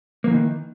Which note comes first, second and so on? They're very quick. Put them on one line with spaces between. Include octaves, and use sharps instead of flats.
A#3 F#3 E3 D#3